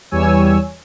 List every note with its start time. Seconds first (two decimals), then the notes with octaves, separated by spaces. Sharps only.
0.11 E2 E3 G3 C#5 G#5 E6